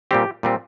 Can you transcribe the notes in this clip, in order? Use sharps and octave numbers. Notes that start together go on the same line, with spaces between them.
A#2 G3 C4 G4
A#2 G3 C4